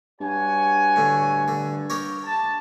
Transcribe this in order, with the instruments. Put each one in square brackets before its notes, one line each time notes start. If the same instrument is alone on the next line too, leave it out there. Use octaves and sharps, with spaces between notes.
[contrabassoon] G2 [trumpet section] F#4 C#5 G#5
[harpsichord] A2 D3
D3
G4 A#4 C#5
[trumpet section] A5